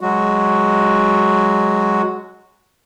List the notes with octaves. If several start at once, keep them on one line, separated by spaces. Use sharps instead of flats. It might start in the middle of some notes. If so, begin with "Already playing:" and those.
F#3 G#3 F#4